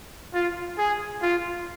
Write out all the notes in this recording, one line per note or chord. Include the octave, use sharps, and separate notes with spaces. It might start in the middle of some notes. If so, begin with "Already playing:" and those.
F4
G#4
F4